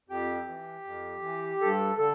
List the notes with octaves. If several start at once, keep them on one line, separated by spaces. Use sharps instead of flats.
F2 G4
E3
F2
E3
G2 A4
D3 A4